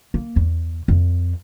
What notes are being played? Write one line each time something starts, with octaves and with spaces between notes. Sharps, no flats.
A#3
E2
F2